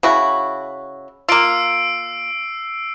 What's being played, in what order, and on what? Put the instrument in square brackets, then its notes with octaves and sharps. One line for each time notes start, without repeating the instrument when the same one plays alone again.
[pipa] C#3 E4 F#4
[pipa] A#3 F4 [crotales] E6 C7 D7